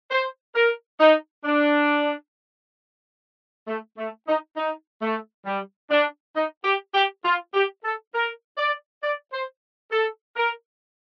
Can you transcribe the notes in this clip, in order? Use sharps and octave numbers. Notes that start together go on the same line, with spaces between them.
C5
A#4
D#4
D4
A3
A3
D#4
D#4
A3
G3
D4
D#4
G4
G4
F4
G4
A4
A#4
D5
D5
C5
A4
A#4